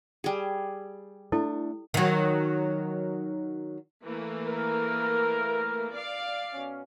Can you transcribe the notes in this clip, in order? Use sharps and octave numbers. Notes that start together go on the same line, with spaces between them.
G3 G#4
A3 D4 E4 A4
D#3 F#3
E3 A3 A#3
A#4
D5 F5
B2 C#4